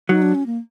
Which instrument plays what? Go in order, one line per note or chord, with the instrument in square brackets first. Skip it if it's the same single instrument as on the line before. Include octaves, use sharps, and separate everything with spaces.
[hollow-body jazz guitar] F#3 [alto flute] D#4
[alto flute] D4
C#4
A#3